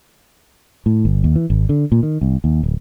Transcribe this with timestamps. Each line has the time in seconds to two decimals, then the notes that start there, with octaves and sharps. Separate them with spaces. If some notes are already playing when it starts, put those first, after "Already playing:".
0.86 A2
1.05 G1
1.24 D#2
1.36 E3
1.50 G#1
1.69 D3
1.92 A#2
2.03 D#3
2.21 C2
2.44 D#2
2.63 D1